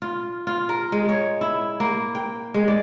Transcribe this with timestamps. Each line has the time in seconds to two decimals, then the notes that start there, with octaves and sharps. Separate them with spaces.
0.02 F4
0.47 F4
0.69 A#4
0.92 G#3
1.09 C#5
1.41 E4
1.80 A#3
2.15 G5
2.54 G#3
2.68 D5